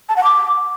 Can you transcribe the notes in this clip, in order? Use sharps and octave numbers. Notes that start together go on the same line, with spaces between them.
A5
F#5
D6